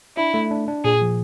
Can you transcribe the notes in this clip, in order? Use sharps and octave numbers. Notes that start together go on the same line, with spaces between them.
D4 E4
A3
D4
D4
A#2 G#4
F3